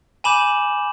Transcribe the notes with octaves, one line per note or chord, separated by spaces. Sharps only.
G#5 B5 D6 G6 E7 F#7